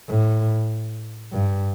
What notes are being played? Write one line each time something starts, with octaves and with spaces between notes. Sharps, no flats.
A2
G2